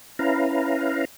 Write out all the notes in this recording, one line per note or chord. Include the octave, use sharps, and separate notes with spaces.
C#4 E4 B4 F5 A#5